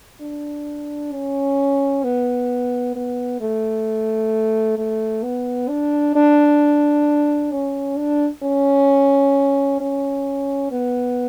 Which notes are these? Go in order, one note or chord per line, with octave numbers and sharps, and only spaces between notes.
D4
C#4
B3
B3
A3
A3
B3
D4
D4
C#4
D4
C#4
C#4
B3